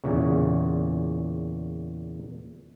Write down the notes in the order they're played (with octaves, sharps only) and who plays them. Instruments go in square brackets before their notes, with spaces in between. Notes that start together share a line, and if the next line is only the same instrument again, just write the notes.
[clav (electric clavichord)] E2 A#2 C#3